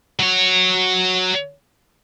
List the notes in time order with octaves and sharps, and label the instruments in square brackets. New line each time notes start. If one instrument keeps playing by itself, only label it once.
[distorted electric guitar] F#3 C#5